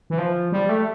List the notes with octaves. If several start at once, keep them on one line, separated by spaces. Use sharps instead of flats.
E3
F3
G3
A3